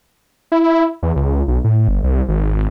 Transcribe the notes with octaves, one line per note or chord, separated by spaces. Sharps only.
E4
E2
C#2
B1
A2
G1
C2
G#1